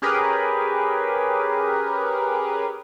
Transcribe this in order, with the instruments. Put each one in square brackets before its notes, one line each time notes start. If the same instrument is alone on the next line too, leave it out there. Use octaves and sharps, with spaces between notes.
[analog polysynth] C#4 G4 G#4 A#4 B4